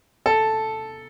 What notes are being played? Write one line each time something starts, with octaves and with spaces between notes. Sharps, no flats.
A4